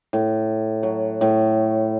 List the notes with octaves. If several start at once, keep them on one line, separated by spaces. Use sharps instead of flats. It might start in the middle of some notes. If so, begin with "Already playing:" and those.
A2
F#3
A2